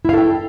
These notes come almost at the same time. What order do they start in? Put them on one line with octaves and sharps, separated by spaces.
E4 F5 A4 G5